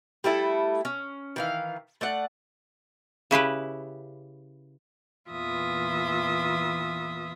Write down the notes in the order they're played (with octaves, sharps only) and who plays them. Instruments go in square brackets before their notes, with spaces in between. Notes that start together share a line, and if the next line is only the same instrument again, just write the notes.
[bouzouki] G3 A3 E4 A4
C#4
D#3 E3 F5
A3 D5 F#5
[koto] C#3 E4 G4 B4
[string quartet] E2 A#2 E3 F4 E5 D#6